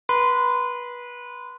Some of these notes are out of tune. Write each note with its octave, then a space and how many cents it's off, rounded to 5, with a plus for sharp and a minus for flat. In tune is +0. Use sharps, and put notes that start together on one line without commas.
B4 -25 C6 -30